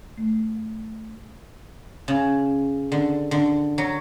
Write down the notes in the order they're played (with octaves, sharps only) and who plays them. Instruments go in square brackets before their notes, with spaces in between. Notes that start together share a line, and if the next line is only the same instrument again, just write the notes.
[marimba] A3
[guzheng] C#3
D3
D3
F#3